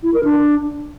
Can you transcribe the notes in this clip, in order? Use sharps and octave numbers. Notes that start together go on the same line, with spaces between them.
E4
A#4
D4